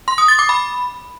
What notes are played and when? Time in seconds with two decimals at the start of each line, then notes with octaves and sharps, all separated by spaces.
0.08 C6
0.18 D#6
0.28 A6
0.39 D6
0.49 B5